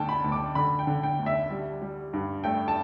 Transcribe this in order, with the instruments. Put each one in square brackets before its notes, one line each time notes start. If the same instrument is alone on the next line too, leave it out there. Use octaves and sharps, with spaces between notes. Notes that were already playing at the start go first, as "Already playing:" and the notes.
Already playing: [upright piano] D2 D3 G5 A5
B5
D2
D6
D3 B5
G5
D3
G5
D2
E5
G3
G3
G2
A3 G5
A5